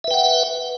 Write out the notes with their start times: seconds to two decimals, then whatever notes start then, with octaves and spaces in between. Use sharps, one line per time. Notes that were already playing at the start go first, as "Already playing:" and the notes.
0.04 E5
0.08 B4
0.11 G5
0.14 F#5